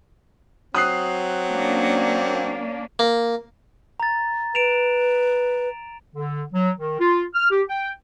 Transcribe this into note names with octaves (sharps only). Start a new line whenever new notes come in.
F#3 C4 D#6 F#6 C7
A#3 C#4 D4
A#3
A#5 A6
B4 D7 E7 F7
D3
F#3
D#3
F4
F6
G4
G5